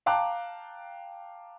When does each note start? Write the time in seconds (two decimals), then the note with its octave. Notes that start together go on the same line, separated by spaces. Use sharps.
0.06 F5 G5 A5 A#5 D6 F#6